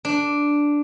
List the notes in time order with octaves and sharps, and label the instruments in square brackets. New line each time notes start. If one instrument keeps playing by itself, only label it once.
[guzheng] D4